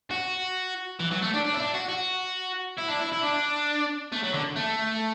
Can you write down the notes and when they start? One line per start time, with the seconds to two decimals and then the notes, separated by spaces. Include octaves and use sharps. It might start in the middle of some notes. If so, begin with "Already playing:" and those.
0.11 F#4
1.00 E3
1.11 F#3
1.22 A3
1.33 D4
1.45 D4
1.54 E4
1.59 D4
1.74 F#4
1.89 F#4
2.78 E4
2.89 D4
2.99 E4
3.13 E4
3.22 D4
4.12 A3
4.23 F#3
4.34 D3
4.56 A3